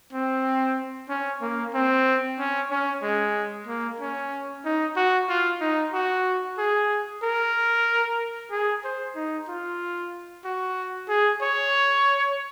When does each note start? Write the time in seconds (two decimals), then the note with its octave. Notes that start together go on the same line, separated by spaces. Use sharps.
0.13 C4
1.09 C#4
1.41 A#3
1.73 C4
2.38 C#4
2.71 C#4
3.02 G#3
3.67 A#3
4.00 C#4
4.65 D#4
4.96 F#4
5.29 F4
5.61 D#4
5.93 F#4
6.58 G#4
7.23 A#4
8.51 G#4
8.84 C5
9.16 D#4
9.48 F4
10.44 F#4
11.09 G#4
11.42 C#5